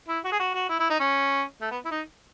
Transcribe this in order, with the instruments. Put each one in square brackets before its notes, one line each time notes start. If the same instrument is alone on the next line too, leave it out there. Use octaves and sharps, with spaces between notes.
[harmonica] E4
F#4
G#4
F#4
F#4
E4
E4
D#4
C#4
A3
B3
E4
D#4